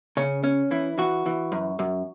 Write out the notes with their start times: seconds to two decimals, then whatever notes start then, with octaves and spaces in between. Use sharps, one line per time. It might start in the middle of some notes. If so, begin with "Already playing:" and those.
0.17 C#3 C#4
0.44 C#4
0.71 E3 E4
0.98 E3 F#4
1.26 E3
1.52 F#2
1.79 F#2